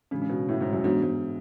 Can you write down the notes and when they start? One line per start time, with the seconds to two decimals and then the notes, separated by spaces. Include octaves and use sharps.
0.11 A2 C#3 E3 G#3 D4 F#4
0.22 C#3
0.29 B2
0.49 A2
0.61 G#2
0.73 F#2
0.84 G#2 E3 B3 D4 F#4
1.02 G#2